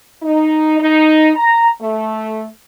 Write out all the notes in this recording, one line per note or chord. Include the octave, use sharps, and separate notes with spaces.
D#4
D#4
A#5
A3